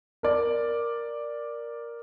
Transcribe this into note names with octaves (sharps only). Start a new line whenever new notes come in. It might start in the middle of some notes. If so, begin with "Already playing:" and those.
A#4 D5